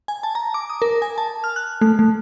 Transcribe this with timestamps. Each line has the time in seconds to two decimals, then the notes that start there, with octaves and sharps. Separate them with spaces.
0.08 G#5
0.23 A5
0.35 A#5
0.54 D6
0.70 D#6
0.82 A#4
1.02 G#5
1.18 A5
1.44 F6
1.56 F#6
1.81 A3
1.99 A3